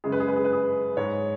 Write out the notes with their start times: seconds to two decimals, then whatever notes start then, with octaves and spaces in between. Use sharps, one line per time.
0.04 F#2 C#3 G#3 G#4
0.12 B4
0.20 G#4
0.28 B4
0.36 G#4
0.45 B4
0.53 G#4
0.97 G#2 G#3 C#5